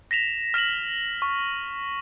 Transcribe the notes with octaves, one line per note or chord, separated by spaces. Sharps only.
A#6 B6 E7 F7
F6 A#6 E7 F#7
C#6